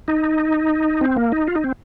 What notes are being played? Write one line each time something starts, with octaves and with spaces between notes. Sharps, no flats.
D#4
C4
A#3
D#4
F4
D#4
C4